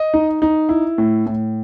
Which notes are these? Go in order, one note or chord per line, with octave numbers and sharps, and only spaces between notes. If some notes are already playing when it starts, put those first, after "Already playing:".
Already playing: D#5
D#4
D#4
E4
A2
A2